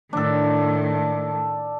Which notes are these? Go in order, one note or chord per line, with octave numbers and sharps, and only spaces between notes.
A2 D#3 D4 A4